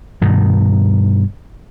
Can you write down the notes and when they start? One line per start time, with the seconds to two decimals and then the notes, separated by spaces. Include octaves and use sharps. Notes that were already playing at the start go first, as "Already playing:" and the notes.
0.21 G2 B2 D#3